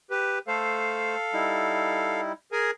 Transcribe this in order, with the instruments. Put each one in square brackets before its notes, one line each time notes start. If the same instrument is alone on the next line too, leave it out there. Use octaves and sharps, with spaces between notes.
[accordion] G4 B4
[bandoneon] A3 C5 [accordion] A4 F5
[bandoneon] G3 D#4 E4
[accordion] G#4 A#4 G#5